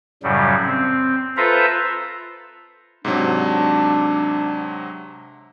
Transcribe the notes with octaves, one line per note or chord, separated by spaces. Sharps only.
F#2 A2 C#3 F#3 G3
C4
F4 A4 B4 C5 E5 A#5
G#2 C3 F#3 D4